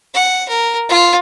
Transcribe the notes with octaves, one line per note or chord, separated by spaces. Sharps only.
F#5
A#4
F4